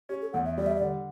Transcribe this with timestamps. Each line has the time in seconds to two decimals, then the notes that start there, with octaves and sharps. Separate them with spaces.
0.09 C#4 G4
0.22 A4
0.33 E2 F#5
0.45 E5
0.57 G3 D5
0.66 E5
0.75 D5
0.81 D3